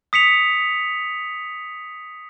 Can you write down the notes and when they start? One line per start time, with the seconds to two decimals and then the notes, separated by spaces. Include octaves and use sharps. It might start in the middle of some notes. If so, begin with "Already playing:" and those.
0.13 D#6 B6 C#7 F7